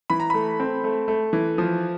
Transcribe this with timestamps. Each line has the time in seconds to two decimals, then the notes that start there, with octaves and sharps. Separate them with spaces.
0.10 E3 B5
0.20 A#5
0.30 A3 B5
0.60 C4
0.84 A3
1.08 A3
1.33 E3
1.58 F3